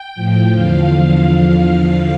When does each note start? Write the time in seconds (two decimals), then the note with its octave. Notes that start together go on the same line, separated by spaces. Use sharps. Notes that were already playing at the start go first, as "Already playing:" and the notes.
Already playing: G5
0.15 A2 F3
0.53 E2 D3 F3 F5
0.92 E2 D3 F3 F5